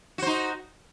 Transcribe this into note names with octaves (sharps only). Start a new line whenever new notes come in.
D#4 F#4 C5